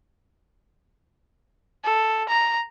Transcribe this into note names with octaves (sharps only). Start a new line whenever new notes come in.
A4
A#5